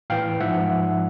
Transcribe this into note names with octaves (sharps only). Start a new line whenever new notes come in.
A2 E3 F5 G5
G#2 F3 E5 F#5